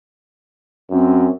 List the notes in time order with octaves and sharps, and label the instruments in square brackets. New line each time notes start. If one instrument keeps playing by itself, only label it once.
[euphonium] F#2 [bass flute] C4